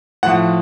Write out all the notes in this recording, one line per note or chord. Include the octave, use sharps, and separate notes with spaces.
A2 F3 F#5